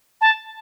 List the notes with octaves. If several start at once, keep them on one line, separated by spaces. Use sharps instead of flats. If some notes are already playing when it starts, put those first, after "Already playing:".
A5